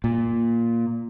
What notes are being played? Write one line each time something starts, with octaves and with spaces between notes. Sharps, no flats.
A#2